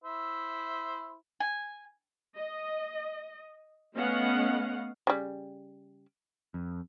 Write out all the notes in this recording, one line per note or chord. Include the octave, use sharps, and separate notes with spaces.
E4 C5 E5
G#5
D#5
A3 B3 C#4 D#5 F5 F#5
C#3 G3
F2